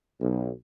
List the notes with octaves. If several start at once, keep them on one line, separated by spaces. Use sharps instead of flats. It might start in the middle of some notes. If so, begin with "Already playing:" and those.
B1